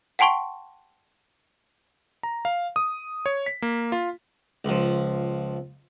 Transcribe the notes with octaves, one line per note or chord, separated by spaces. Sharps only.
F#5 G5 A5 C6 C#6 D7
A#5
F5
D#6
C#5
B6
A#3
F4
C#2 F3